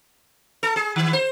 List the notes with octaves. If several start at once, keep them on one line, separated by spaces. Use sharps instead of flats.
A4
G#4
D#3
C5